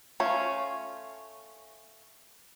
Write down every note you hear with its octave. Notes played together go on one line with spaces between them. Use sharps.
A3 C#4 F4 C#5